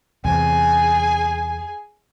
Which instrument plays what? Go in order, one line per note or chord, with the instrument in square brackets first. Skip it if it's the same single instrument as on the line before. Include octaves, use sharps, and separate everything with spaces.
[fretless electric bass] E2 C3 [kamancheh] G#4 G#5